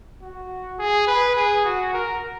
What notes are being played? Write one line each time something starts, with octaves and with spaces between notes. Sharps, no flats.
F#4
G#4
B4
G#4
F#4
A#4